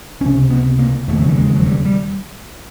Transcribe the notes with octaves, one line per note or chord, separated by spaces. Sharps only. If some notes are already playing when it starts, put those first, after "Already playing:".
C#2 C#4
C3
B3
A#3
E1 D#2 C#3 A3
F#3
G3
G#3
F#3
G3
G3